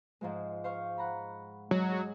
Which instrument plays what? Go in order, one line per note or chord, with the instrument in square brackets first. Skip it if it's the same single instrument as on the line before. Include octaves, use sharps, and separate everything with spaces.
[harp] G#2 F3 G#3
C5 F5 C#6
F#5 A#5 B5
[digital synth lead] F#3 [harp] G#3
[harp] G#4